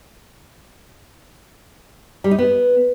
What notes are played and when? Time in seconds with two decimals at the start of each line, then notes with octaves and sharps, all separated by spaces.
2.24 G3
2.31 D#4
2.38 B3